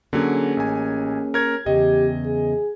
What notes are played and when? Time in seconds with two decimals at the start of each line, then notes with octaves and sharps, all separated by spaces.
0.13 D3 F#3 A#3 C#4 G#4
0.57 A1 G#5
1.34 A#4 C#5 G#6
1.66 E2 C#3 G4 D#5
2.26 G#4